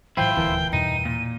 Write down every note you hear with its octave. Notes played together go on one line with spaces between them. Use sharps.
A2 E3 F#3 E4 F4 C5 G5
D#1 D2 E3 C4 A#4 A5
E2 G2 B2 D#4 D#7
A#2